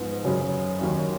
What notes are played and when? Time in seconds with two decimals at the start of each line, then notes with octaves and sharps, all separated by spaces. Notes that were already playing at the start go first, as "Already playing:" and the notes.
Already playing: G#2 F3 B3 D#4
0.24 F#2 C#3 F#3 C#4
0.79 D#2 D#3 F#3 C#4